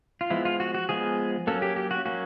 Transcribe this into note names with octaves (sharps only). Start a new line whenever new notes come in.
F4
F3 G#3 B3 E4
F4
F#4
F#4
F3 G#3 B3 G#4
F#3 A#3 C#4 A4
G4
G4
F#4
F#3 A#3 C#4 F#4